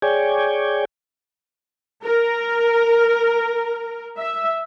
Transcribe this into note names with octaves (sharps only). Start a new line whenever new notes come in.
G#4 C#5 D5 G5 G#5
A#4
E5